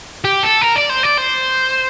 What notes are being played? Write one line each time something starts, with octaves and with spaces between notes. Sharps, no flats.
G4
A4
A#4
D5
C5
D5
C5